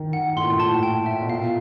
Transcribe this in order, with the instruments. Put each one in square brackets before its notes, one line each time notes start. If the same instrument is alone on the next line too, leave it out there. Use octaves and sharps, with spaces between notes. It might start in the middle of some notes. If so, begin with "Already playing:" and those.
Already playing: [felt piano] D#3
[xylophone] F#5
[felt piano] A2 [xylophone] C6
[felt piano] A#2
A2
[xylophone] A5
G5
E5
[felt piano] B2
[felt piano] A#2 [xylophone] F5